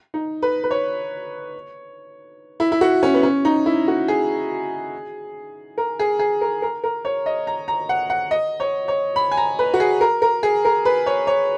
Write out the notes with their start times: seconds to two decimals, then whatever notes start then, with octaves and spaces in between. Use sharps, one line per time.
0.14 D#4
0.42 B4
0.64 B4
0.71 C#5
2.60 E4
2.72 E4
2.81 F#4
3.03 C#4
3.14 B3
3.23 C#4
3.45 D#4
3.66 E4
3.88 F#4
4.08 G#4
5.78 A#4
5.99 G#4
6.19 G#4
6.41 A#4
6.62 A#4
6.84 A#4
7.05 C#5
7.26 D#5
7.47 A#5
7.68 A#5
7.89 F#5
8.10 F#5
8.31 D#5
8.60 C#5
8.88 C#5
9.16 B5
9.31 G#5
9.37 A#5
9.59 B4
9.74 F#4
9.80 G#4
10.01 A#4
10.22 A#4
10.43 G#4
10.65 A#4
10.85 B4
11.06 C#5
11.27 C#5